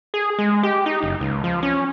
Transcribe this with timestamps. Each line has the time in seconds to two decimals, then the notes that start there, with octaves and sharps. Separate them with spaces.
0.14 G#4
0.39 G#3
0.63 G4
0.86 D#4
1.03 F#1
1.21 C#2
1.44 F3
1.63 C#4